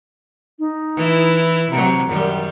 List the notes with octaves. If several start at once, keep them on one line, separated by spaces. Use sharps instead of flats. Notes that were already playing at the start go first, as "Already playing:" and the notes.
D#4
E3 E4
C3 F#3 A#5
F#2 D#3 G3